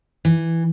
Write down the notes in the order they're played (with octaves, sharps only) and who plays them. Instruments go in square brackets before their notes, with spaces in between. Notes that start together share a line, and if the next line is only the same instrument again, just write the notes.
[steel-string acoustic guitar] E3